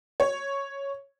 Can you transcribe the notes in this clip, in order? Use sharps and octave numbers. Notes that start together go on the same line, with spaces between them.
C#5